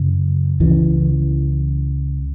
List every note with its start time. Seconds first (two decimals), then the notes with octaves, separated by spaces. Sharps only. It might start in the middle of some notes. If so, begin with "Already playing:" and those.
Already playing: F#2 C#3
0.60 C#2 C#3 E3